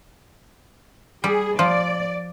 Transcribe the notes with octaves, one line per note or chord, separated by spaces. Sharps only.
G3 G#4
F3 D5